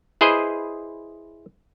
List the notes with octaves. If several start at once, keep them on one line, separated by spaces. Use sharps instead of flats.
E4 G#4 B4 C5 D#5